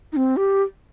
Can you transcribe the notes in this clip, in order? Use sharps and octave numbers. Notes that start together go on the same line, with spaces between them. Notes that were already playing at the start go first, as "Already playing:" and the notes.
D#4
C4
G4